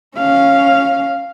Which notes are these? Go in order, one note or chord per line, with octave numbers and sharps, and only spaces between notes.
C#4 F5